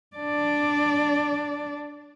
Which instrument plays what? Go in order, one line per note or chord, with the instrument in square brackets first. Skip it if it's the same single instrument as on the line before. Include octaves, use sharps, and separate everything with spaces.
[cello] D4 D5